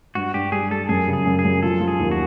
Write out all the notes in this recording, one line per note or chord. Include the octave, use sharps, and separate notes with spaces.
G2 F#4
G2 G4
G3 G#4
G3 A4
F#2 G#4
C#3
G#4
F#2
G#4
F#2
F3 A4
F3
G#4
D#2
F#4